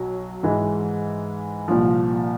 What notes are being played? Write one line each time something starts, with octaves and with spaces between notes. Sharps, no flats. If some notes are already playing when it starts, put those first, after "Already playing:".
Already playing: B1 F#3
G#2 E3 G#3
C2 A#2 F3